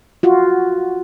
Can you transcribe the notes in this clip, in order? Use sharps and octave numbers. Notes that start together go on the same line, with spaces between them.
F4 F#4